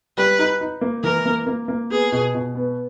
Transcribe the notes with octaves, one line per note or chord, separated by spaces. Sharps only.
G3 B4
D#4
D#4
A#3
E3 A#4
A#3
A#3
A#3
B3 G#4
B2
B2
B3